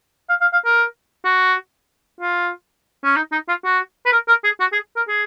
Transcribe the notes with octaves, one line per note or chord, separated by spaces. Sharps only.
F5
F5
F5
A#4
F#4
F4
C#4
D#4
D#4
F4
F#4
B4
A#4
A#4
G#4
F#4
G#4
A#4
G#4